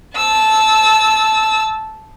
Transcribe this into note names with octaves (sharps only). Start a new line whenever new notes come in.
A5 E6